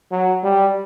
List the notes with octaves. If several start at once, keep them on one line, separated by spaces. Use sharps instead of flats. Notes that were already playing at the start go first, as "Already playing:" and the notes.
F#3
G3